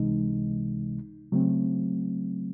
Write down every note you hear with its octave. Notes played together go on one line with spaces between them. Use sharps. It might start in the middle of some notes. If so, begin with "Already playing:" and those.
Already playing: C#2 C3 E3 G#3 D#4
C#3 F#3 A3 C4